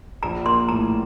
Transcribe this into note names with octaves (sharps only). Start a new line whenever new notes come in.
A#1 A#5
A#3 C6
A2 A#5